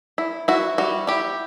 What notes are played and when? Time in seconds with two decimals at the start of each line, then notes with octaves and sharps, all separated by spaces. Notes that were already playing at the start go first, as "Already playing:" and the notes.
0.18 E4
0.48 E4 F#4
0.78 G3 F#4
1.07 E4 G4